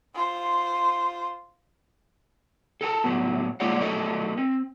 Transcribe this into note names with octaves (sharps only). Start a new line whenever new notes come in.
F4 C5
A4 A#4 G#5 A5
A2 F#3 B3
G#3 A#3 F4 C#5 D5 F#5
F#3 A3 A4 A#4 D#5
C4